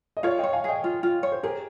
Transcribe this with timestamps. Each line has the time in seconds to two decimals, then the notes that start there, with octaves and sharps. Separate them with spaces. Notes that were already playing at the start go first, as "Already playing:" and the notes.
0.17 D#5
0.23 F4 C#5 F5
0.38 C#5 D#5 G5
0.53 F5 G#5
0.64 G#4 D#5 G5
0.84 F4
1.03 F4
1.23 C#5
1.32 C5
1.43 G4 G#4 A#4